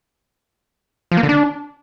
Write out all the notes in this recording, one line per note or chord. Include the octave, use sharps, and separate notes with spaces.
F3
A#3
D3
D4